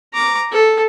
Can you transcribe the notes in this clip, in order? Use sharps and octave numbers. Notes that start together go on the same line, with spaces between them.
A#5 D6
A4